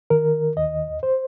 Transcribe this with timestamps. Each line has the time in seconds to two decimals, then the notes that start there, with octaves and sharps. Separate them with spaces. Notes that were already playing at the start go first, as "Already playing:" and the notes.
0.10 D#3 A#4
0.57 D#2 D#5
1.03 C5